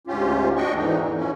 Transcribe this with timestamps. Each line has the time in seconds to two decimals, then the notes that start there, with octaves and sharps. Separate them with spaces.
0.07 D2 G#2 C#4 F4 G4
0.56 D4 F#4 D#5 G5 C#6
0.76 E2 G#2 D3 E3 D#4
1.02 E2
1.17 A2 F3 C#4